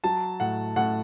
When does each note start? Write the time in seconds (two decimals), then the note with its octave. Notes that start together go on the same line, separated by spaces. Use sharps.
0.04 F#3 A5
0.40 A2 F#5
0.76 A2 F#5